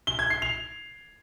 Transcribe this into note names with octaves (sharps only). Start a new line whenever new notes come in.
G7
G#6
C7
F7